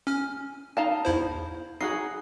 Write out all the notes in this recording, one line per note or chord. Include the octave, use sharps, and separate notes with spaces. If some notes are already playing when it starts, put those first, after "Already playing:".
C#4 F6
D#4 F5 A5
E2 E4 C5
D#4 F#4 G#4 C7